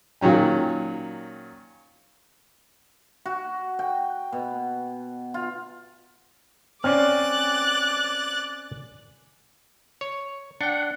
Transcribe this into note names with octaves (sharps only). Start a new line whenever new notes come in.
A#2 D#3 F#3 C#4 G5
F#4
G5
B2
F4
C4 C#4 D5 G#5 D6 F6 F#6 A6
C#5
D4 F#5 G5